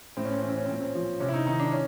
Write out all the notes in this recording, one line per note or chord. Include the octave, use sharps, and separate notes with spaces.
A2 C4
C#4
C4
E3 C#4
C4
C#4
C4
A#2 C#4
C4
F3
C3 C#4
E4
D#4
D#3 D#4
D4
C#4